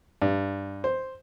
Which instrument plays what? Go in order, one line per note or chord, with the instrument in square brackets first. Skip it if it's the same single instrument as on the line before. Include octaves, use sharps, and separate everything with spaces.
[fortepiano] G2
C5